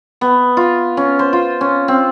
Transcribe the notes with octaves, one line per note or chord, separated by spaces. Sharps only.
B3
F4
C#4
C5
F4
C#4
C4